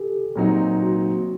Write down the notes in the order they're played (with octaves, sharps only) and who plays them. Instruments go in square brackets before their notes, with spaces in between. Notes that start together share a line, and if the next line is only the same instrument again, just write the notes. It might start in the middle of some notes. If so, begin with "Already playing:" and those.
Already playing: [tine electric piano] G4 A4
[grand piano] A#2 F#3 C4 D#4
[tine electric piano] F#4